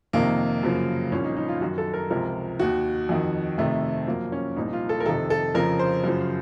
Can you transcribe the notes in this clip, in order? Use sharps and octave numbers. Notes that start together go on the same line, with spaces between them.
F2 C3 D#3 A#3
F#2 C#3 F3
C2 A#2 F3 C#4
D#4
D#4
F4
F#2 D#3 F#4
A4
A#4
C#2 C3 F3 A#4
D#2 D#3 F#4
F2 D#3
F2 C3 D#3 A3
F#2 F3 A#3
C#4
C2 A#2 F3 D#4
F4
A4
A#4
F2 C3 D#3 A4
A4
F2 C#3 F3 A#4
C5
F#2 C#3 F3